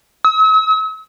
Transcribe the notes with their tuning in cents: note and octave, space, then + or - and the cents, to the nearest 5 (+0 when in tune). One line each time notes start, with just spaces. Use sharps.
E6 -45